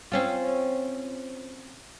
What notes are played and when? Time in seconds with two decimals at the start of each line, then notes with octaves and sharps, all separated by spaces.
0.12 C4 C#4 F4